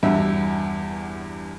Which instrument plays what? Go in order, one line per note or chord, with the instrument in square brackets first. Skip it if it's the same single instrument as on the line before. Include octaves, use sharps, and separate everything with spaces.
[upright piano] E2 G2 F#4 E5